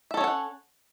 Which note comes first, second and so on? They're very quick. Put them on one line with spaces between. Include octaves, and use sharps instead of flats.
E5 A4 C#5 C#4 F#5